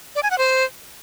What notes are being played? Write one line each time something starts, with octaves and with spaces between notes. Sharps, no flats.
D5
G#5
F#5
C5